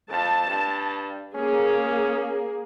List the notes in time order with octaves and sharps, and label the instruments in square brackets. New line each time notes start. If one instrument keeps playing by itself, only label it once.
[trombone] F2 [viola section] A5
[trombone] G2
[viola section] A#3 G#4 [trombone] C#4